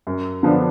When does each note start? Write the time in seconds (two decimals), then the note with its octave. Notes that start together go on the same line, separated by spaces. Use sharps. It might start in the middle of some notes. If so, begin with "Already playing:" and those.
0.07 F#2
0.43 D3 F3 B3 D4